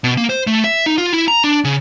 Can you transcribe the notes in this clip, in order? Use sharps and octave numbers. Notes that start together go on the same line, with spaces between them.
B2
A#3
C5
A3
E5
D#4
F4
E4
A#5
D4
C#3